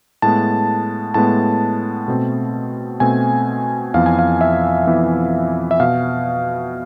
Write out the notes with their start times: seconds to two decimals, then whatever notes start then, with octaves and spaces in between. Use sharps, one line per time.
0.22 A2 G#3 B3 A5
1.14 A2 G#3 B3 A5
2.08 B2 A3 C4
3.00 B2 A3 C4 G#5
3.94 F2 E3 B3 F5
4.06 G#5
4.19 F5
4.41 E5
4.87 F2 E3 B3
5.71 E5
5.80 B2 B3 F5